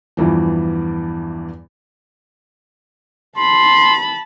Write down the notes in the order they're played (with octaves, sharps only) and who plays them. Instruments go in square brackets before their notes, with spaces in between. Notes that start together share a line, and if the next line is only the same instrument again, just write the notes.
[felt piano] E2 G2 E3 F3
[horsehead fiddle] A5 B5 [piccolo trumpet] C6